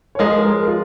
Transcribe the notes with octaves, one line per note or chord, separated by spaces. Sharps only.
C#5
F3 G#3 A#4
A#4
F4